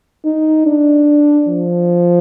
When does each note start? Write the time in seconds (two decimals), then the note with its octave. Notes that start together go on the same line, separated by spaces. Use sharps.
0.25 D#4
0.66 D4
1.48 F3